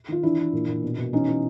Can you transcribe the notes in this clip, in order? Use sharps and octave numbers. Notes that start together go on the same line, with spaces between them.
D#3 F4
E3 D4 E4
E3
A#2
A#2
B2
B2
E3 C#4 D#4
E3